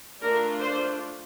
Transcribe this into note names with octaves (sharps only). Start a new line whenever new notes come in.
A3 D4 F4 A#4
C5